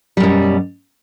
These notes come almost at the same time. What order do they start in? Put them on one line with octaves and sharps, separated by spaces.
G3 F#2 B2